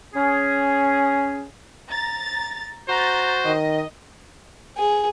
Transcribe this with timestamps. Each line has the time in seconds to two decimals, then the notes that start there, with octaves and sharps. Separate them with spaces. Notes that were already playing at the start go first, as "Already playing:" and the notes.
0.14 C#4 G#4
1.89 A#5 A6
2.88 F#4 C5 A#5 G6 A6
3.45 D#3 D#5
4.77 G#4